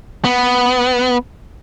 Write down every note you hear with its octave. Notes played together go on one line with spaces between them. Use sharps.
B3